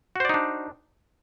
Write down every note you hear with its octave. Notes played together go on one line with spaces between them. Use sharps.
D4 D#4 F#4 C5 D5